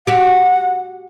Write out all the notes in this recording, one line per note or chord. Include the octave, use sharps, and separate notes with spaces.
F#4 G4 F#5